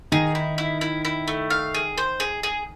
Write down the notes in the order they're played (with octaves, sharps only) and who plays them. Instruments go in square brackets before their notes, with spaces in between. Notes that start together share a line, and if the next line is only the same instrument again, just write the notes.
[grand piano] D#3 D#4 [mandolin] G#4
[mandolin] E4
E4
E4
E4
A3
F5
G#4
C5
G#4
G#4